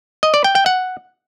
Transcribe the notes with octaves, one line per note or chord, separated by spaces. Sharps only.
D#5
D5
G5
G5
F#5